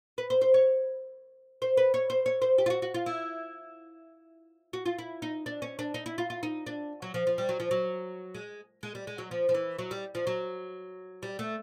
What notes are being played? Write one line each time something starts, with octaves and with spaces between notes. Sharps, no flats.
B4
C5
C5
C#5
C5
B4
C#5
C5
C#5
C5
G4
F4
F#4
F#4
F4
E4
F#4
F4
E4
D#4
D4
C#4
D4
D#4
E4
F4
F4
D#4
D4
F#3
F3
F3
G3
F#3
F3
F#3
G#3
G#3
G3
G#3
F#3
F3
F3
E3
F#3
G3
F3
F#3
G3
A3